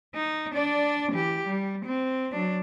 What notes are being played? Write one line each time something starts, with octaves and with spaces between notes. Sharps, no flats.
D#4
D4 D5
E3 G4
G3
C4
F#3 D4